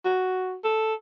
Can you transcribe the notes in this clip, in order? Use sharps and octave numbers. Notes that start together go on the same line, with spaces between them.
F#4
A4